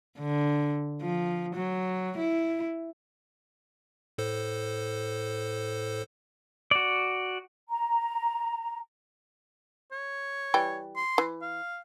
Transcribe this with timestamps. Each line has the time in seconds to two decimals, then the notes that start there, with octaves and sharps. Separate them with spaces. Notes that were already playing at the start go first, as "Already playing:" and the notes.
0.19 D3
1.02 F3
1.55 F#3
2.17 E4
4.18 A2 A4 C5
6.71 F#4 D5
7.69 A#5
9.91 C#5
10.54 E3 G3 G5
10.96 C6
11.18 E3
11.42 F5